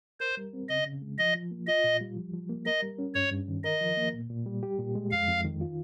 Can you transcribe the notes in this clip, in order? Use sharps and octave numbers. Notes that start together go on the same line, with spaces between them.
A#4 C5
G3
C4
C#3 D#5
C#3
G#3
F3 D#5
F3
A#3
F4 D#5
A#2
G3
F3
F3
A#3
A#4 D#5
G3
C#4
G2 C#5
G2
D#3
A#4 D#5
F3
A#3
A#2
A#2
G3
G4
A#2
G#3
F2 F5
F2
D#3
F4